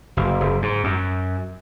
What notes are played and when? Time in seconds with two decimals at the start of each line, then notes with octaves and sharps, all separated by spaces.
0.17 F#1
0.41 F#1
0.62 G#2
0.84 F#2